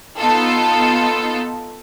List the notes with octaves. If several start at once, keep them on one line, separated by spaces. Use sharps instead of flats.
B3 D#4 F4 A4